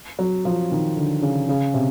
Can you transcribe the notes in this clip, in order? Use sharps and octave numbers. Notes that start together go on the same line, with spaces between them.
F#3
F3
D#3
D3
C#3
C#3
C3